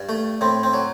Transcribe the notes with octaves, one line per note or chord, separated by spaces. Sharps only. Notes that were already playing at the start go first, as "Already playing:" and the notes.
Already playing: G2
A3
A2 C4
C4
F#3